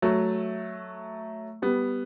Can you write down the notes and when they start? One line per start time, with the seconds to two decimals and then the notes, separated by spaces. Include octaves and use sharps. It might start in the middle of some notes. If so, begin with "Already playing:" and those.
0.02 F#3 A3
1.62 G3 B3